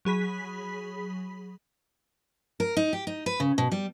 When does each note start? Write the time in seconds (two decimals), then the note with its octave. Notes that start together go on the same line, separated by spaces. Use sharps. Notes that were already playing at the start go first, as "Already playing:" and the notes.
0.05 F#3 G#4 B5 B6
2.60 A#4
2.77 D#4
2.93 G4
3.07 D#4
3.26 B4
3.40 C#3
3.58 B2
3.71 G3